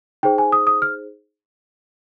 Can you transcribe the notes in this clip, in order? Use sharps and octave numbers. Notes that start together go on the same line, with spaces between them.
D#4 G#4 C5 G5
G#5
D#6
D#6
F6